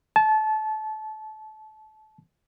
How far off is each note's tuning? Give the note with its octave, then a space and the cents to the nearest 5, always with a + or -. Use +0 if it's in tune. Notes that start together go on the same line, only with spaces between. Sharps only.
A5 -25